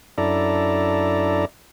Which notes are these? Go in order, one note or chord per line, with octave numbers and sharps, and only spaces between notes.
F#2 D4 E4 A4 D5 A#5